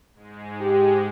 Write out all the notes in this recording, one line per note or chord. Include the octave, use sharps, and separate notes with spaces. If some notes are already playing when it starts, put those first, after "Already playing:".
G#2 G#3
G4